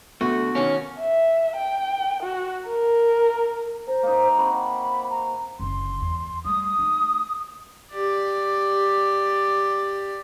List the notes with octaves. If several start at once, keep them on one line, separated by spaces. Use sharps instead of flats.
D3 A3 B3 F#4
B2 D#3 A#3 C#4
E5
G5
F#4
A#4
C5 A#5
A#3 D#4
C4 F#4 B5 D6
A#5
F#1 D3 C6
E2
G3 A3 D#6
A3 D#4
G4 D5